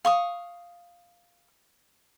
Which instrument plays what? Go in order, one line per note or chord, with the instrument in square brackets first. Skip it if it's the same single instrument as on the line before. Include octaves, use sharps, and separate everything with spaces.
[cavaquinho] F5 C#6 D#6